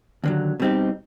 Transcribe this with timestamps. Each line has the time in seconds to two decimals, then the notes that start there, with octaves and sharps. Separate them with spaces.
0.24 D#2 D3 F#3
0.60 B2 G3 C4 D#4 G4